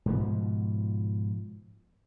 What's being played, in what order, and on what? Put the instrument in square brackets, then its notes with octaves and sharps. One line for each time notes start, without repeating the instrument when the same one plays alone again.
[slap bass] G#2 B2 F3